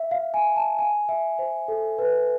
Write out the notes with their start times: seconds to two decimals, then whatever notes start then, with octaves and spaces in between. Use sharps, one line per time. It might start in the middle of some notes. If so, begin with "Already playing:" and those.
Already playing: E5
0.11 F5
0.34 G#5
0.56 A5
0.79 G#5
1.09 E5
1.39 C5
1.68 A4
1.99 B4